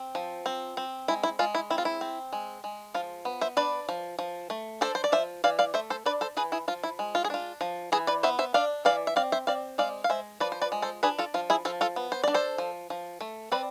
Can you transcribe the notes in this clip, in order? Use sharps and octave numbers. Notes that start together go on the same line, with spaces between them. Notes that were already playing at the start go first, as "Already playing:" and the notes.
Already playing: C4
F3
C4
C4
G#3 E4
E4
G#3 F4
E4
C4 E4
F4
E4
C4
G#3
G#3
F3 F4
B3
C5 E5
D4 B4 D5
F3
F3
A3
D4 A4 C5
C5
D5
F3 C5 E5
E3 D5 F5
D5 F5
A3 C5 E5
A4 C5
D4 B4 D5
A4 C5
E3 G#4 B4
E4 G#4
F3 F4
E4
G#3
F4
G#4
D4 F4
F3
E3 E4 G#4
B4 D5
B3 C5 E5
C5 E5
D4 D5 F5
E3 D5 F5
E5
C4 D5 F5
C5 E5
C4 D5 F5
G#3 D5 F5
F5
G#3 C5 E5
F3 B4 D5
C5
B4 D5
G#3
A4 C5
D4 G#4 B4
F4 A4
F3 F4
E4 G#4
F3 F4 A4
F4 A4
B3
C5
D4 D5
A4 C5
F3
F3
A3
C4 B4 D5